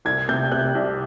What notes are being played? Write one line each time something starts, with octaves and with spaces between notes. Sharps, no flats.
C2 G#6
C3 G6
C3 F#6
C2